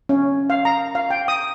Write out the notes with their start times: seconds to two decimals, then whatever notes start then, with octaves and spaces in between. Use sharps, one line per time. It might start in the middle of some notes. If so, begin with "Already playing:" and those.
0.09 C#4
0.50 F5
0.65 A#5
0.95 F5
1.10 G5
1.28 D#6